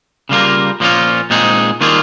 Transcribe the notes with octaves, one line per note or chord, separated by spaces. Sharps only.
C#3 G3 A#3 F4 A#4
A#2 F3 A#3 C#4 F4
A#2 G#3 C4 D#4 G#4
D#3 G3 A#3 F4 G#4